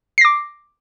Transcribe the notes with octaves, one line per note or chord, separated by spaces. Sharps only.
D6 A#6 C7